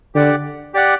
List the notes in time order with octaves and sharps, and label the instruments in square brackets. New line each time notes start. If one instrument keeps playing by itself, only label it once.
[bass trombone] D3 [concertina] G4 D5 F#5
[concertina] G4 D5 F#5